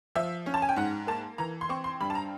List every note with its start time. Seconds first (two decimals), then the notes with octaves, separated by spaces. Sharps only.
0.15 F3 E5
0.46 C#4
0.54 A5
0.62 G#5
0.69 G5
0.76 G#2 F#5
1.07 A#3 A5
1.38 E3 A#5
1.61 C6
1.69 C4 C#6
1.84 C6
2.00 G2 B5
2.10 A5
2.15 A#5